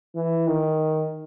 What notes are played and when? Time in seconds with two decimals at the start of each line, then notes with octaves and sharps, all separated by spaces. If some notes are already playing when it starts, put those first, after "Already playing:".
0.15 E3
0.47 D#3